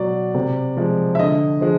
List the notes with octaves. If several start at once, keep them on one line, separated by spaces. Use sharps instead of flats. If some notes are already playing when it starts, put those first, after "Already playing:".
Already playing: B2 F#3 D5
C3
F3 G#3
E5
D3 D#5
F3 G#3